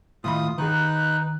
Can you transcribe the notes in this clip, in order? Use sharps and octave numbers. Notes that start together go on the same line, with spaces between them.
A2 D#3 F4 B5 D#6
D#3 D#4 G#4 B4 F#6